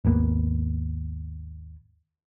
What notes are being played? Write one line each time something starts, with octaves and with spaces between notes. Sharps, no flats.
G#1 D#2 A#3 B3